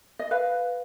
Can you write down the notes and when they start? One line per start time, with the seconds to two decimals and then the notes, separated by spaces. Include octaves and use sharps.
0.19 D#5
0.31 B4 F5